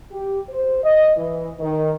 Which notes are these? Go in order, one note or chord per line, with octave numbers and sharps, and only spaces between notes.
G4
C5
D#5
E3
D#3